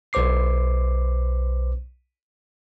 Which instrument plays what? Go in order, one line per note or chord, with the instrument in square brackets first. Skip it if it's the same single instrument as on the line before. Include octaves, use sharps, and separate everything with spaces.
[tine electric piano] B1 B4 C5 D6 C7